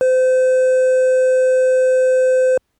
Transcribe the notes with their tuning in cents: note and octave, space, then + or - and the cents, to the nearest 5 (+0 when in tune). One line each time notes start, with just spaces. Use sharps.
C5 -30